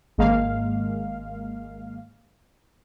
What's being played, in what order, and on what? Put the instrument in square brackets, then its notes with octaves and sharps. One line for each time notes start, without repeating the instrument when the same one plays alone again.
[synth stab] G#1 G#3 A#3 F5